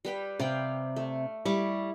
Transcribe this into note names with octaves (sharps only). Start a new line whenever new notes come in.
G3 B4 G5
C3 D5 F5 G5
A3
G3 E4 C#6 D6